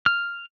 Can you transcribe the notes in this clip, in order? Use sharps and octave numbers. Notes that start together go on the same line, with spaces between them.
F6